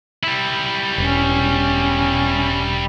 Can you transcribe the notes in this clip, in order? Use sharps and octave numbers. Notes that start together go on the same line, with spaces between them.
G3 E4
E1 C#4